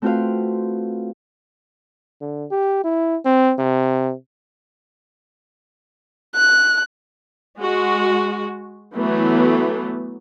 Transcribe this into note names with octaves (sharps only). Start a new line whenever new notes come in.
A3 C4 F4 F#4 B4 F5
D3
G4
E4
C4
C3
F#6
G#3 F#4
E3 F#3 A3 B3